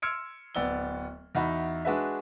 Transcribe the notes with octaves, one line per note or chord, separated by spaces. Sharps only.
C6 E6 F6 G#6 C#7 D7
D1 B3 D5 E6 G7
E2 D#4 E4 F#4 E5 B5
G#3 D4 F#4 G#4 B4 E5